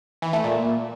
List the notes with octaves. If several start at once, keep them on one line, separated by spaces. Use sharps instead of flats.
E3
A3
A#2